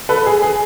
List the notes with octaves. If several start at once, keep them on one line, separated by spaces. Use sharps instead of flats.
A4 B4
G#4
G#4